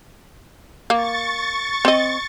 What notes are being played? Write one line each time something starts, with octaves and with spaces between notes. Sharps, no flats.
A#3 C#6 A6
C4 D#5